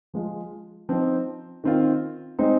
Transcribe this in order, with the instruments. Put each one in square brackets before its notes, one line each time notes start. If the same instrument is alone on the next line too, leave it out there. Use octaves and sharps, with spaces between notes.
[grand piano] F3 G#3 F4
F3 C4 D#4 C5
D#3 C4 F4
G#3 C4 D#4 C5